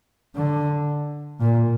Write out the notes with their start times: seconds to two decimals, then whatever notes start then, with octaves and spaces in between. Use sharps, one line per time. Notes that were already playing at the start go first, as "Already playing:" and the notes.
0.36 D3
1.40 A#2